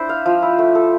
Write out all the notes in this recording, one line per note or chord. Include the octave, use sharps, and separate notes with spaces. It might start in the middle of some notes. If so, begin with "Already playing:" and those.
Already playing: D4 E4 C5
F5
F3
E4
A3
A4